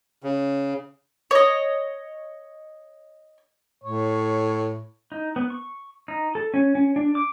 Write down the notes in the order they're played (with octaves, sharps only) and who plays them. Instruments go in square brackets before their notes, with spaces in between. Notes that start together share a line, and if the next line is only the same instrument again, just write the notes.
[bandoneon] C#3
[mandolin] C#5 D#5
[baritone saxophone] A2 [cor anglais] C#5
[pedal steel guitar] D#4
B3
C#6
D#4
A4
C#4
C#4
D4
D6